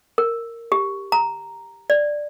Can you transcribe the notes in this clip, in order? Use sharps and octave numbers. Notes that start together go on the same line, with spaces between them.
A#4
G4
A#5
D5